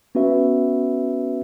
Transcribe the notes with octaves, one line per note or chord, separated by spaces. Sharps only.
B3 C#4 F#4 B4 E5